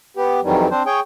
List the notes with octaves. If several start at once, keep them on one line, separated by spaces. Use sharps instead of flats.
B3 G4
F2 D#3 E3 F#3 G3
C4 D4 C5
G#4 C#5 G5